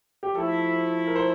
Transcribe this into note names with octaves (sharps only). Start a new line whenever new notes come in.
G4
F3 A3 E4 A4
A#4
C5